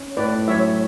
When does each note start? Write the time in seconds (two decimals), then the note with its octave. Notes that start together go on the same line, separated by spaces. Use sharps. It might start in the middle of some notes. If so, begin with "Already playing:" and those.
Already playing: C#4
0.17 A2 B4 D5
0.48 F#3 C#5 E5